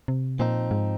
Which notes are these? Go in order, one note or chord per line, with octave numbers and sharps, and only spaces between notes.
C3
A#2 F3 C4 D#4
G#2